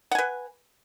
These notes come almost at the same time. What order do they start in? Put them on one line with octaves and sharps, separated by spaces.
F#5 G#5 B4